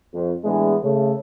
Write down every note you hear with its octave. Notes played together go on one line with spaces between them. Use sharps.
F2
A2 E3 G#3 B3 D4 G#4
C#3 A3